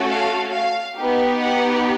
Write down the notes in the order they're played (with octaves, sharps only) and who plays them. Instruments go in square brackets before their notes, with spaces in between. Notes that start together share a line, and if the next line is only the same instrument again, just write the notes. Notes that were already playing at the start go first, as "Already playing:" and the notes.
Already playing: [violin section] A3 C#4 F#4 A4
F5
F5
B3 D#4 G4
F#5